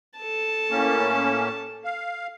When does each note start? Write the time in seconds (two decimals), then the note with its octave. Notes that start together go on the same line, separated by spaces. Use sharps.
0.18 A4 A5
0.71 A2 A#3 C#4
1.84 F5